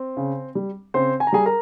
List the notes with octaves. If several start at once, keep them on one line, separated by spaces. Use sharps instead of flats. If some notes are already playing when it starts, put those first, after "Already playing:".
Already playing: C4
C#3
G3
C#3 C4 C5
G#5
A#5
G3 G#4 G#5
A#4 A#5